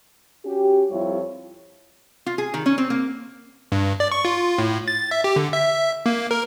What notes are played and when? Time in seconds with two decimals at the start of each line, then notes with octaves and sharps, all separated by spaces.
0.45 C#4 F#4 G4
0.90 F2 G3 E4 F4 C#5
2.26 F4
2.38 G#4
2.54 D#3
2.66 C#4
2.78 C4
2.90 A#3
3.72 G2
4.00 D5
4.12 C#6
4.25 F4
4.58 A2
4.88 A6
5.11 E5
5.24 G4
5.36 D3
5.53 E5
6.06 A#3
6.31 A#4